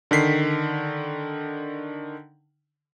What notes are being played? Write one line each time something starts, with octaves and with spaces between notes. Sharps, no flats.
D3 D#3 B6 C7